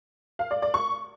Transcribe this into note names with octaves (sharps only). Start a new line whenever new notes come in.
F5
D5
D5
C#6